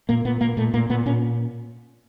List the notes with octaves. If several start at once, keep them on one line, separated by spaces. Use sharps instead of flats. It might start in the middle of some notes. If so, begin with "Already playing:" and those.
A#2 A#3
A#2 B3
A#2 A#3
A#2 A3
A#2 A#3
A#2 B3
A#2 C#4